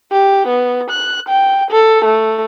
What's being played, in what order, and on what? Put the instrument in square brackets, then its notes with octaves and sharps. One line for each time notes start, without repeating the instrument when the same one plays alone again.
[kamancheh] G4
B3
F#6
G5
A4
A3